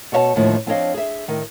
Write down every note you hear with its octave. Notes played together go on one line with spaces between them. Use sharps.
B2 F#4 C#5 E5 F#5 A5
D#2 A2 D3 D#3 F3
F3 C4 D4 C#5 D#5 F5
G#4 E5
A2 D#3